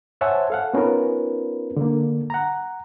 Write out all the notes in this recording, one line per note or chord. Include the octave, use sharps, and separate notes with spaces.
C5 C#5 E5 F#5 G#5 A5
A4 F5 F#5
B3 C#4 D#4 F4 A#4 B4
D3 A#3
F#5 A#5